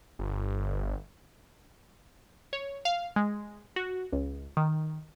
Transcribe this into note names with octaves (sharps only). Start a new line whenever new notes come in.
G1
C#5
F5
G#3
F#4
C#2
D#3